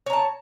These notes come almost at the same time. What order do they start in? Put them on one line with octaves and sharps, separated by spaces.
C#5 A#5 A5